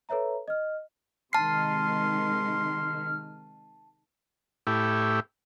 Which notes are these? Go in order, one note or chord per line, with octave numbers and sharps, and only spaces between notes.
A4 B4 C#5 E5 A#5
D#5 F6
C3 D#3 G#3 A5 C6 F6 C7
A2 E4 G4